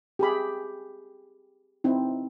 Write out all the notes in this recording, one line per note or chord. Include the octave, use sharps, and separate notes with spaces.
G4 G#4 B5
C4 D#4 E4